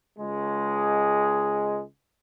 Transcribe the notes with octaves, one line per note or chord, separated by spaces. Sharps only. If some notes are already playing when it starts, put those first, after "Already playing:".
C#2 G#3